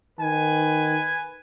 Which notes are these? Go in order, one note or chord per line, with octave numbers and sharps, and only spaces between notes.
D#3 B4 G#5